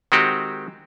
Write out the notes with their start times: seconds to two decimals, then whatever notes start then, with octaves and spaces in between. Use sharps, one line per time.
0.12 D#3 G#3 C4 F#4 G4